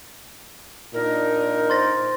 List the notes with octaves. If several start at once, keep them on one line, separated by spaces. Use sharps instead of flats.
A#2 D4 D#4 A#4
C5 C6 A6 A#6